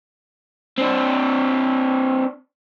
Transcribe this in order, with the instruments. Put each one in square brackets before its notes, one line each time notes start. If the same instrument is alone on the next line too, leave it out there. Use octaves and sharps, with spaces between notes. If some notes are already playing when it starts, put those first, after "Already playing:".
[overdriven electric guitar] C4 D4